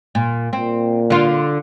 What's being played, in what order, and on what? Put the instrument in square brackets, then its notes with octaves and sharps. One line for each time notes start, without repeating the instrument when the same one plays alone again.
[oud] A#2
[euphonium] A#2 [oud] C4
[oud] D3 F4